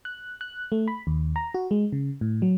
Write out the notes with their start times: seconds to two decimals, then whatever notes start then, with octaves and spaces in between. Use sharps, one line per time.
0.05 F#6
0.41 F#6
0.72 A3
0.88 B5
1.07 D#2
1.36 A#5
1.54 F#4
1.71 G#3
1.92 C#3
2.21 A2
2.42 F#3